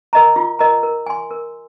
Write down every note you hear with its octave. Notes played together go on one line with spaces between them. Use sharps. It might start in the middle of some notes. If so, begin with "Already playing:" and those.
A#4 D#5 A#5
F4
A#4 D#5 A#5
A#4
G#5 C6
A#4